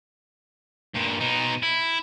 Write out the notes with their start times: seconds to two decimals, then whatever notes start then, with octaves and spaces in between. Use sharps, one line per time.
0.96 G2 A#2
1.21 B2 D#4
1.63 E4